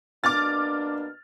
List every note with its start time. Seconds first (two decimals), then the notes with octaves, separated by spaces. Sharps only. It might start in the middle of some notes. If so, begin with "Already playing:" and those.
0.24 B2 A#3 D4 D6 F6 A6